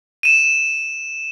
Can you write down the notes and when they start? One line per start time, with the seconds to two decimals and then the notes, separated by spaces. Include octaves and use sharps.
0.23 D#7 E7